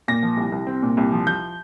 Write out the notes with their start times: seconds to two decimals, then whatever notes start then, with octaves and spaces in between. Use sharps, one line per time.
0.08 A#2 A#6
0.23 F3
0.37 C2
0.52 C2
0.67 C4
0.83 A#2
0.97 C2
1.12 F3
1.26 F3 G6